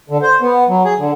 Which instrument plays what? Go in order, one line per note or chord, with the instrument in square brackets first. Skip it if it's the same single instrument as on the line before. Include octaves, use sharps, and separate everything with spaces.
[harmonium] D3
C5
B3
F#3
G#4
D3